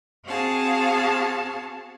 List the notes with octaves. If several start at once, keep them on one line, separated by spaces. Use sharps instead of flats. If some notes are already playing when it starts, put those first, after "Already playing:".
C4 F#4 G#4 F5 A5